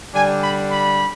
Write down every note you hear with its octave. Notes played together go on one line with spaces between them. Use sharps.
D3 G3 D4 G#5
B5
B5